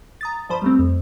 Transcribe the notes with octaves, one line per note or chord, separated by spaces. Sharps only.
A#5 D#6 A6
G2 F3 C5 B5
G3 A3 C4
F2